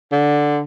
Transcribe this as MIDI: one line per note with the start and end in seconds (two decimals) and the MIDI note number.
0.12 0.61 50